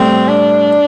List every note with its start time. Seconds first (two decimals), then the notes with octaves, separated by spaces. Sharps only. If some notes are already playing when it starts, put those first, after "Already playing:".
Already playing: A2 G3 C4
0.28 D4